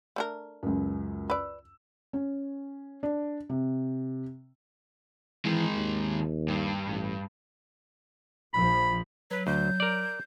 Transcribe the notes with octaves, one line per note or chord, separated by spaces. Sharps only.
A3 D4 A#4
C#2 F#2
B4 D5 E6
C#4
D4
C3
D#3 E3 G#3
D#2
G2
A1
A#1 F3 B5
F#3 B4
D2 G6
A#4 D5